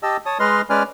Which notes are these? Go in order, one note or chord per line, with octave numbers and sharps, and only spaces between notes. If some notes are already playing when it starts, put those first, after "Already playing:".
G4 D#5 A5 E6
C#5 A5 D#6
G#3 B4 D#5 C6 F6
G#3 C#4 B4 D5 G#5 F6